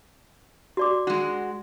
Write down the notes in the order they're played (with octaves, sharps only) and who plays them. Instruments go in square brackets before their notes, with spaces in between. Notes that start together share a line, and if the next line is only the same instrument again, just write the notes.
[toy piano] F#4 D5 D6
[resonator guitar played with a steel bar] G#3 F#4 [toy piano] F#5